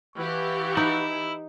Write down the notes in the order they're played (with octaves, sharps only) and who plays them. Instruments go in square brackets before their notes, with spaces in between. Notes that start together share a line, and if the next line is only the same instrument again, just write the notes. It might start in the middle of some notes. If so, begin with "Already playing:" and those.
[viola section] E3 G4 [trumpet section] F5 F#5 C#6
[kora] D#4 [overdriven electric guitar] E4